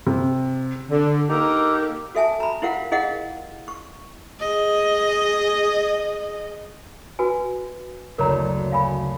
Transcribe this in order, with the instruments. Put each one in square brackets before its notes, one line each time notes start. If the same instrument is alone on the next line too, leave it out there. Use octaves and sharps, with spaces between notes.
[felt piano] C3
[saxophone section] D3
A#3 D#4 G4 A4 A#4
[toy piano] F#4 A4 E5 G#5 A5
A#5 B5
E4 F4 G4 A#4 F5 F#5
E4 G#4 A#4 D#5 F5 F#5
C#6
[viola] G#4 D#5
[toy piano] F#4 B4 G#5
[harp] F#1 D2 [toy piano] A#4 C#5 A#5
[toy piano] F5 G#5 B5